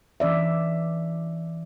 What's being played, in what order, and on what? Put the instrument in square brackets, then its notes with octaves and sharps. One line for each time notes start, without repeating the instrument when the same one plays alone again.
[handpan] E3 C#4 D5 E5